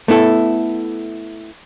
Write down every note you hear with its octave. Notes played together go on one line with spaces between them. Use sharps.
A3 B3 E4 A4